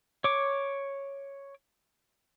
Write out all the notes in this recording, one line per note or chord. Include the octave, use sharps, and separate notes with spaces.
C#5 D6